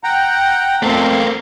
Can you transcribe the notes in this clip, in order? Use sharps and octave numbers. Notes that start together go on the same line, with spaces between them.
F#5 G5 A#5
F2 A3 A#3 C4